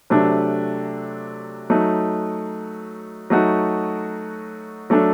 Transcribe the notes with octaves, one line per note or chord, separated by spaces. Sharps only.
C3 F#3 A3 D4
F#3 A3 D#4
F#3 A3 D#4 F#4
F#3 A3 D4 A4